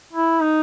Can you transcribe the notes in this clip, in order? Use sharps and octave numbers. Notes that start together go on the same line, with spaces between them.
E4
D#4